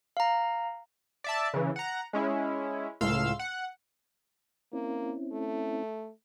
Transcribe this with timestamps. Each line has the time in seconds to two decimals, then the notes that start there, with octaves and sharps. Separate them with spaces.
0.17 F5 A#5
1.24 D5 E5 A5
1.54 C#3 E3
1.76 F#5 A#5
2.13 G#3 C#4 E4
3.01 C#2 A2 F5 C6 E6
3.39 F#5
4.73 A#3 C4 C#4 E4
5.32 A3